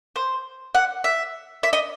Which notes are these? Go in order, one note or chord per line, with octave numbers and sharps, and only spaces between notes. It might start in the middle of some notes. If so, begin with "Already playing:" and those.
C5
F#5
E5
E5
D#5